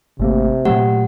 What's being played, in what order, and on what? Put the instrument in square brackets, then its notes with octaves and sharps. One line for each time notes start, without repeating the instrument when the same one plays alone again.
[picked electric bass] G#1 A3 A#3 [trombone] C3
[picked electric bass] A#2 F#3 A3 [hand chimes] G4 F#5